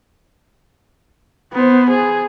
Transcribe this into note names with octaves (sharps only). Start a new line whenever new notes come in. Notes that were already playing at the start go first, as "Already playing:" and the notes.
B3 C5
G#4